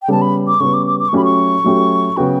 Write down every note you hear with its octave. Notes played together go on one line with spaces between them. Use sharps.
G5
C#3 G3 B3 A5
B5
D6
C#3 G3 B3 C#6
D6
D6
D6
C#6
F#3 A3 C#4 G4 B5
C#6
F#3 A3 C#4 G4
C#3 F#3 B3 F#4 G5